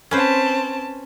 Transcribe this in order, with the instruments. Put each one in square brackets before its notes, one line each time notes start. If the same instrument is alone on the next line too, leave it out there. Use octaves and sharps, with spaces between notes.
[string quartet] C4 A5 [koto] C#4 B4 C5